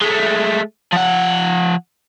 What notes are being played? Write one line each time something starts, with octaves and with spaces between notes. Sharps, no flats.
G#3 A3
F3 F#5